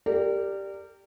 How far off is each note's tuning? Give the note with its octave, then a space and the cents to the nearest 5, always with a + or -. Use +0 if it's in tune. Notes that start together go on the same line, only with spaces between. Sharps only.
G4 +0 A#4 -25 D5 +0